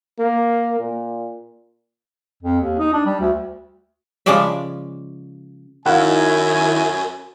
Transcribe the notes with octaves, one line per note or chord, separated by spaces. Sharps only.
A#3
A#2
F2
D#2
D#4
D4
G3
D2
C#3 F3 G#3 G#4 D5 E5
F#2 D#3 E4 F5 F#5 G#5